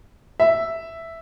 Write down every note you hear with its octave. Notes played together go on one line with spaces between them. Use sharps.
E5